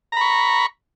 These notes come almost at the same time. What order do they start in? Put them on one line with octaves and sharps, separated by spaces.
A#5 B5 C#6